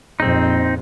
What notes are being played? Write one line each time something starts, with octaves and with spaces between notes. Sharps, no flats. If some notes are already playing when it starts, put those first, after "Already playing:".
A#1 F2 C4 D#4